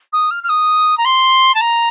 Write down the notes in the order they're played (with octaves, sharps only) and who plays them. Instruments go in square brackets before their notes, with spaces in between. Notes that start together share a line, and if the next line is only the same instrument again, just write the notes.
[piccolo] D#6
F6
F6
D#6
A#5
C6
A5
A#5